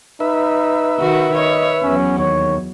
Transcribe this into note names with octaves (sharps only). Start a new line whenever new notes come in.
D#4 B4 E5
D#3 F#4
C#5 D#5
E2 F#3 C#4
D#2 C#5